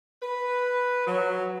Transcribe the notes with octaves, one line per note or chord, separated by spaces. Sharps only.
B4
F#3